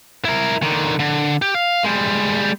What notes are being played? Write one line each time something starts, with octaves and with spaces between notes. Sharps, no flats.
E4 A#4
D3 D#3
D3
G4
F5
G3 G#3